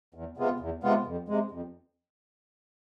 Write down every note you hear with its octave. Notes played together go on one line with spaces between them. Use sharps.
E2
C3 G#3 B3 F4
E2
C3 G#3 B3 F4
F2
C3 G#3
F2